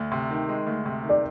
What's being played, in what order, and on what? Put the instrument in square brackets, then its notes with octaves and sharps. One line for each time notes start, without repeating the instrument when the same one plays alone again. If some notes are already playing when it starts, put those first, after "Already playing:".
Already playing: [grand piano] D2
C3
D#3
G#3
D2
C3
D#3
[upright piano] D5